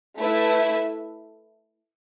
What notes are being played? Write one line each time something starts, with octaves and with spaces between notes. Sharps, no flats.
A3 E4 B4 E5